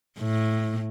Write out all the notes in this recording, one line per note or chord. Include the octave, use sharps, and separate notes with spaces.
A2